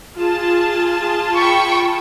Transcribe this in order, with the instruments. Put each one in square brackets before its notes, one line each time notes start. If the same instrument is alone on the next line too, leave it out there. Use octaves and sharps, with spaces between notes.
[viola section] F4 G#4 A5
[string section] G5 B5 C#6